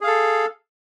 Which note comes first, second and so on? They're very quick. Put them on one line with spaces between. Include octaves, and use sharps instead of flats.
G#4 F5 A4